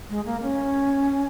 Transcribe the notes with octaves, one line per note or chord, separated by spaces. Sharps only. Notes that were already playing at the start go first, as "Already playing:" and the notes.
G#3
A#3
C#4